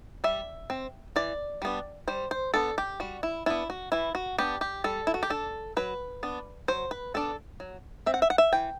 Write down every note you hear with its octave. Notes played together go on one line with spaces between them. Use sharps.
G3 E5
C4
E3 D5
G3 B3 D4
G3 C5
C5
B3 D4 A4
G4
G3 F#4
E4
B3 D4 E4
F#4
E3 E4
F#4
B3 D4 G4
G4
G3 A4
E4
F#4
G4
D4 A4
F#3 B4
B3 D4
F#3 C5
B4
B3 D4 A4
F#3
C4 E5
F#5
E5
F#5
E5
E3 G5